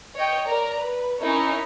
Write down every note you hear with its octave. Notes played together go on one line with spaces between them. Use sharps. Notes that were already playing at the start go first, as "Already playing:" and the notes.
C#5 D#5 G5
A#4 D5 A#5
B4
C#4 D#4 E4 A#4 C#5